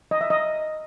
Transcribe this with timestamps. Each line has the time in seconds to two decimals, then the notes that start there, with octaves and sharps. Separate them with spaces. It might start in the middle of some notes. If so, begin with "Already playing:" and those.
0.11 D#5
0.21 E5
0.30 D#5